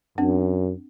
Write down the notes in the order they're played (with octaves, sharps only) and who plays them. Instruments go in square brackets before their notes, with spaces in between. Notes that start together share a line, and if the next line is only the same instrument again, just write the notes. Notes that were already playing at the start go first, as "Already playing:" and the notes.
[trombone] F#2 [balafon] C4 D4